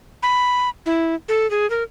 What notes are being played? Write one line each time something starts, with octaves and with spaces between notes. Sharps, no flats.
B5
E4
A4
G#4
A#4